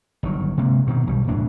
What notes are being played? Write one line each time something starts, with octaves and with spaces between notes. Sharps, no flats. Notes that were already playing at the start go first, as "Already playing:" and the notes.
G1 D#3 F#3
C3 G#3 A#3
G2 B2 D#3
B1 G2 B2 G3
E1 D2 A2 D4